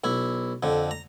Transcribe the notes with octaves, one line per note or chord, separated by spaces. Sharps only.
B1 E4
F2 D3
A#5